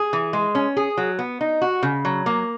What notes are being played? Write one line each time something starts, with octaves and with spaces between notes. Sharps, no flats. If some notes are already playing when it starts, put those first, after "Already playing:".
Already playing: G#4
E3
G#3
C#4
G#4
F#3
B3
D#4
F#4
C#3
F#3
A#3